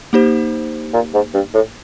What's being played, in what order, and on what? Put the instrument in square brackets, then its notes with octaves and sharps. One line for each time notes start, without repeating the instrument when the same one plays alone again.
[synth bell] A#3 D#4 G4 C5
[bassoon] A#2
G#2
G2
A2